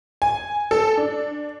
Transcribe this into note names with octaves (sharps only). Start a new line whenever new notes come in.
G#5
A4
D4